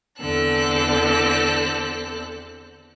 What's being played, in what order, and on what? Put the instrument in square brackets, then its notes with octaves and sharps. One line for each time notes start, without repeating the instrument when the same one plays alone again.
[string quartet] E2 D3 C4 A4 F#6